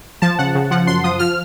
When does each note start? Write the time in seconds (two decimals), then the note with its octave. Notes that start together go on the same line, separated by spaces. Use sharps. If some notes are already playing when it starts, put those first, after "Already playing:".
0.22 F3 A5
0.39 C#3 F#5
0.55 C#3
0.71 F3 F#5
0.87 F#2 C6
1.04 F3 D#6
1.19 F3 F6